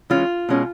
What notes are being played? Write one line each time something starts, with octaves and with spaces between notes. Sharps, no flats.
E3 G#3 C#4 F4
B2 G#3 C#4